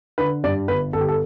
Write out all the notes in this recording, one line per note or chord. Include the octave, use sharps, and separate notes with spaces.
D3 B4
G2 D5
G1 B4
G1 A4
G4
A4